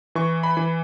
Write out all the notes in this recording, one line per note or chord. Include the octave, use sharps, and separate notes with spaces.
E3 C#6
B5
E3